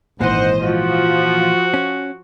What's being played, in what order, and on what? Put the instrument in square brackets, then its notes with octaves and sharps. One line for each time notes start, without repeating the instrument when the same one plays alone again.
[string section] G#1 C5 D#5 [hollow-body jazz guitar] A#2 E3 [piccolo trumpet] F#5
[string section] F3 [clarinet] F4 [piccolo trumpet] F#4
[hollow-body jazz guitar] C#4